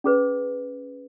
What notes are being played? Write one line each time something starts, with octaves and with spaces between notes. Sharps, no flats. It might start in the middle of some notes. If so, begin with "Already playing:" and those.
C#4 G#4 B4